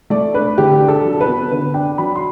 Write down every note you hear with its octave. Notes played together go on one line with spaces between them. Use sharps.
A3 D5
D4 B4
D3 G4
D4
A4
F#3
B4
B3
D3 B4
D4 G5
F#3 B5
C6